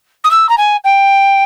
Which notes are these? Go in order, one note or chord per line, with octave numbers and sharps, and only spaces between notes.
D#6
E6
A#5
G#5
G5